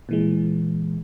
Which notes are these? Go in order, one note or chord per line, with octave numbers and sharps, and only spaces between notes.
A#2 E3 G#3